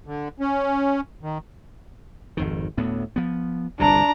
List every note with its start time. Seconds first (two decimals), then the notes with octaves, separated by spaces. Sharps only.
0.06 D3
0.40 C#4
1.23 D#3
2.37 G#1 F2 D#3
2.77 D2 A2 B3
3.16 F3 B3
3.80 G1 C2 B2 D4 A#5